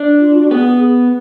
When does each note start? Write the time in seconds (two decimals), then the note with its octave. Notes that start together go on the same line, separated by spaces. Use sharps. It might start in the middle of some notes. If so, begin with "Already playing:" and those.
Already playing: D4
0.20 F4
0.35 F#4
0.51 B3 G#4